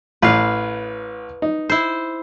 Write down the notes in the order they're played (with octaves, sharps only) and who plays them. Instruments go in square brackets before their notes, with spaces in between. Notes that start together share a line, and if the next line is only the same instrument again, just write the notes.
[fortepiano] A1 A2 [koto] B4 F5
[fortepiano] D#4
[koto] E4 C5